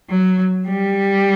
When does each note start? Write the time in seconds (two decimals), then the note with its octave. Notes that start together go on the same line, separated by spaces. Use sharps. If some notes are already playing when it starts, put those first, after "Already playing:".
0.10 F#3
0.67 G3